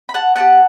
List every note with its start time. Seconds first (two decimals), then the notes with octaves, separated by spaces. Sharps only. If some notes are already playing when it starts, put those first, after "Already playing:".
0.09 B5
0.14 F#5 A5
0.36 B3 E4 G4 F#5 A5